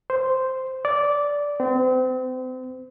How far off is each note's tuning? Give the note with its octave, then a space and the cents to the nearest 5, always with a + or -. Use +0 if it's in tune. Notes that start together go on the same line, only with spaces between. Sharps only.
C5 -5
D5 -10
C4 -35